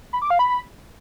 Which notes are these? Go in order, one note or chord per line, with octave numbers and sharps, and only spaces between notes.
B5
D6
F5
B5